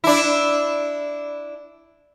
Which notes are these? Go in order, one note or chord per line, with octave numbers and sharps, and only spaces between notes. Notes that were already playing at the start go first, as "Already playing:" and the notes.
D4 E4